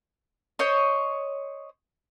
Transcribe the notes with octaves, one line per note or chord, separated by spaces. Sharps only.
C5 C#5 D#5